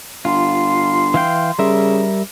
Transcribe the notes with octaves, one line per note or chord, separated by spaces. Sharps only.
G1 F4 C6
E3 F5 G5
C#3 G3 A#4 E5